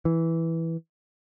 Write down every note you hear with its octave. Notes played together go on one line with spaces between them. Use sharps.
E3